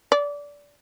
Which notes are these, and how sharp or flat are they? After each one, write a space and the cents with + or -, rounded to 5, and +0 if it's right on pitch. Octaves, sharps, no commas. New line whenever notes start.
D5 -20